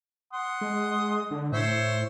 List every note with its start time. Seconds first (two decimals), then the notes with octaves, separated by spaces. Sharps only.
0.33 F#5 C6 D#6
0.61 G#3
1.31 D3
1.52 A2 C5 C#5 E5